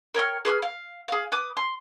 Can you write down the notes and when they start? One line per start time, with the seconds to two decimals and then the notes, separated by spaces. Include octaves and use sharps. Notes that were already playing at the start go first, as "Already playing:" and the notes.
0.14 A#4 C#5 G5 F6
0.45 G#4 B4 D6 F6
0.62 F5
1.08 G#4 F5
1.32 B4 D6 D#6
1.57 C6